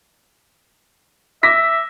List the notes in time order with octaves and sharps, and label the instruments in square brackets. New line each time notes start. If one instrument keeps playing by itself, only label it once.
[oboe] E5 [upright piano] D6 A#6 B6